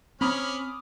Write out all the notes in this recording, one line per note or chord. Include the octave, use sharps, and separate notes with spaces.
C4 C#4 B5 D6 D#6 F6